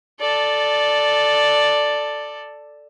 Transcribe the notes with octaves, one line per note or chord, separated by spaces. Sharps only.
A4 D5